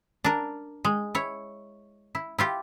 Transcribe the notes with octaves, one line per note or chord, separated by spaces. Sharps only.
D4 A#4
G#3
E4 C#5
E4
E4 F4 G4